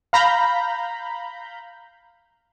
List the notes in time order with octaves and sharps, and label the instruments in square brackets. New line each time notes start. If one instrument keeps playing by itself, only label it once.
[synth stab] F5 A#5 B5 G6